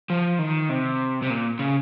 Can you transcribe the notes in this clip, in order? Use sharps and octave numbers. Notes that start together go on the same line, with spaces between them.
F3
D#3
C3
C3
A#2
C#3